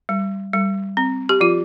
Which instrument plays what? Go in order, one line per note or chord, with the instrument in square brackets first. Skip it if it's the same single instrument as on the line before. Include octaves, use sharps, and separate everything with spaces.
[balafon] G3
G3
C4
G4
F3 F4